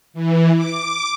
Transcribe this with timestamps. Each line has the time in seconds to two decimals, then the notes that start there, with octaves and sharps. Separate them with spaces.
0.14 E3
0.55 D6